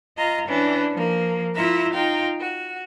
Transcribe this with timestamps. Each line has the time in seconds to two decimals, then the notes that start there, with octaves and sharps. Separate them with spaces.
0.17 F4 D#5 A#5
0.48 E3 C#4 D4
0.93 F3 A#3
1.54 E4 F4 E5 A#5
1.93 D#4 F4 F5 G5
2.40 F#4